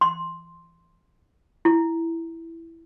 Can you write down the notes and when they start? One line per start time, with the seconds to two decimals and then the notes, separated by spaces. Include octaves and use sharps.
0.01 C6
1.65 E4